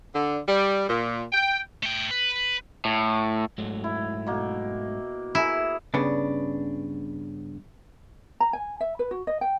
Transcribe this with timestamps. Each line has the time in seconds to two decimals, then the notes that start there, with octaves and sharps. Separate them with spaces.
0.14 D3
0.47 G3
0.89 A#2
1.32 G5
1.83 A3 G5
2.11 B4
2.85 A2
3.58 G#2 F#3 A3
3.84 E4
4.26 B2 A#3
5.35 E4 G#4 A#4
5.94 G2 C#3 B3 D4
8.40 A#5
8.53 G#5
8.80 E5
8.99 B4
9.11 F#4
9.27 D#5
9.41 G5